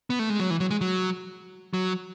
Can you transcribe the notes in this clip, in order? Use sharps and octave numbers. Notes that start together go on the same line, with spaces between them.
B3
A3
G#3
F#3
E3
F#3
G#3
F#3
F#3